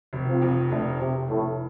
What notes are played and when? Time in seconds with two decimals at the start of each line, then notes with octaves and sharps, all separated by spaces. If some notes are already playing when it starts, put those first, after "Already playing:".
0.13 F1
0.27 C4 F4
0.42 F2
0.71 F1 A3 D4
0.99 F1 C3
1.29 F1 A2